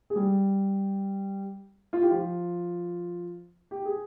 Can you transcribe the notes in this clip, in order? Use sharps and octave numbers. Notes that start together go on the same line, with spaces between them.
G#4
G3 G4
F4
G4
F3 F4
G4
G#4